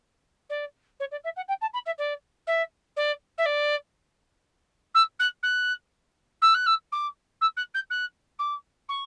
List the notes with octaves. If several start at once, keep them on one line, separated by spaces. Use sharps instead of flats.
D5
C#5
D5
E5
F#5
G5
A5
B5
E5
D5
E5
D5
E5
D5
E6
F#6
F#6
E6
F#6
E6
D6
E6
F#6
G6
F#6
D6
C#6